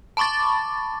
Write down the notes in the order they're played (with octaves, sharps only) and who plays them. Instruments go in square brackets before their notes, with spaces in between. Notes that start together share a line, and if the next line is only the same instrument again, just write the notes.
[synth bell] A5 B5 C#6 D6 A6